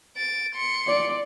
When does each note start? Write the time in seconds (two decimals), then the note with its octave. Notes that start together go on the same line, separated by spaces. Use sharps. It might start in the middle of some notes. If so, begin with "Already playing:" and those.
0.16 A6 D7
0.55 C6 C#7
0.88 D5